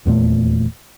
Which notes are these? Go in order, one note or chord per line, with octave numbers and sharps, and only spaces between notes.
D#1 E2 A#2 A3